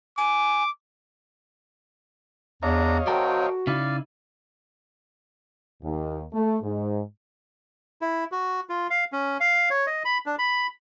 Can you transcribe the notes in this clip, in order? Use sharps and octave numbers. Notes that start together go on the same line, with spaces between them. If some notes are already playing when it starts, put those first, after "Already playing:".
G#5 D6
E2 D4 C#5 D#5 F5 A#5
F#3 C4 F#4 A4 A#4 D5 G5
C#3 D#4 E4 D5 F5
D#2
A3
G#2
E4
F#4
F4
F5
C#4
F5
C#5
D#5
B5
D4
B5